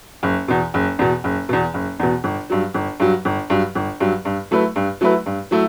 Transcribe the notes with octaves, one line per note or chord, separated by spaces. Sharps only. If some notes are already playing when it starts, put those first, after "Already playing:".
F#1
E2 B2
F#1
E2 B2
F#1
E2 B2
F#1
E2 B2
G1
G2 F#3
G1
G2 F#3
G1
G2 F#3
G1
G2 F#3
G2
F#3 A3 E4 B4
G2
F#3 A3 E4 B4
G2
F#3 A3 E4